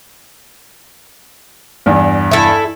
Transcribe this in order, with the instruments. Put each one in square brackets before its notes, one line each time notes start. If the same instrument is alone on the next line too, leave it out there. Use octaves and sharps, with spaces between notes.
[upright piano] E2 G2
[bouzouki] E4 A4